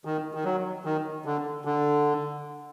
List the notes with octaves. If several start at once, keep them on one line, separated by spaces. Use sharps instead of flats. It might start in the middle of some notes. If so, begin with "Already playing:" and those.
D#3
D#3
F#3
D#3
D3
D3